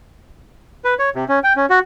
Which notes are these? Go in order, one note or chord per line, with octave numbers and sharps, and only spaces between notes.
B4
C#5
C3
C#4
G5
C#4
F#4